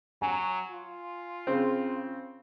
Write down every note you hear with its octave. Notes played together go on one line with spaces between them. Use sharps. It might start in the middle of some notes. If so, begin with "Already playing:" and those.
F#3 G#5
F4
C#3 C4